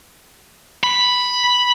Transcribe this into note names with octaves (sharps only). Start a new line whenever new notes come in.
B5